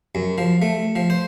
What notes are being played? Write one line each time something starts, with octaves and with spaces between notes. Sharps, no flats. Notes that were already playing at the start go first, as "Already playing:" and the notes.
F#2
F3
A3
F3
C5